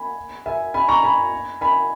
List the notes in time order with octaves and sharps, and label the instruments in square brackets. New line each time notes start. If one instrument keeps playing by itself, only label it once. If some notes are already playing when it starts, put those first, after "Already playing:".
Already playing: [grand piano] G#5 B5
E5 G#5
G#5 B5
A#5 C#6
G#5 B5
G#5 B5